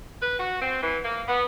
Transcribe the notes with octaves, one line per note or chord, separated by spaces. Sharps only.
B4
F#4
C4
E3
A#3
B3